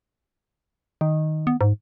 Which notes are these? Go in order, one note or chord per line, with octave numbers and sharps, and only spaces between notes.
D#3
B3
G#2